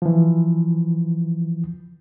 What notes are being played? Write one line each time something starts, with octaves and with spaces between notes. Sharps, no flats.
E3 F3